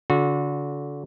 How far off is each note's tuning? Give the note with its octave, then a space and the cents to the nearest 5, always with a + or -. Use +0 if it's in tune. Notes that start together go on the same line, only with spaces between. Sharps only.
D3 -35 F#4 -30